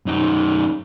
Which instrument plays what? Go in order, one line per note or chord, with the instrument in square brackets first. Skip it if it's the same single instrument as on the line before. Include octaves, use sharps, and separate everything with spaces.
[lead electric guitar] F#2 D#4